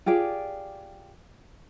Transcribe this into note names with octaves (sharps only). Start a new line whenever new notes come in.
F4 G4 G#4 D5